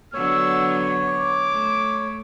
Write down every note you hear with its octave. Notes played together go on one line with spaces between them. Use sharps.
D3 F#3 B3 C#5 E6
D6
A3